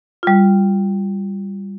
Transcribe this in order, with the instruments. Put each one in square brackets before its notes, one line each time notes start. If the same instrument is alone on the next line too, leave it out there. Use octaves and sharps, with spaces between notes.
[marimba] G3 F4